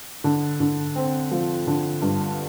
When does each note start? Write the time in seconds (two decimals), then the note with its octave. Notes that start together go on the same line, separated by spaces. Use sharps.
0.24 D3
0.60 D3
0.96 C4
1.31 F3
1.67 D3
2.02 G2